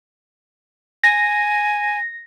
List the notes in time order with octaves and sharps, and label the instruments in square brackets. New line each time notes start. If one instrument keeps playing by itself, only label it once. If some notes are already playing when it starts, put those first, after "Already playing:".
[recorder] G#5 [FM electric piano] A#6